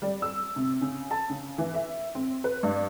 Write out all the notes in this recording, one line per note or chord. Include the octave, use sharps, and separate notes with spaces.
G3
E6
C3
C#3
A5
C#3
E3
E5
C4
B4
G2